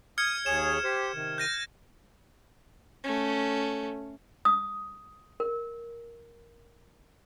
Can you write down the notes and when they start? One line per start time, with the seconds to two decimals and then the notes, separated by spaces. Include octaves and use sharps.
0.18 D#6 F6 G#6 C#7
0.46 D#2 G#4 C#5 E7
0.84 G4 C5
1.14 C3 D#3
1.38 G6 A#6 D#7
3.04 A3 C#4
4.45 D#6
5.40 A#4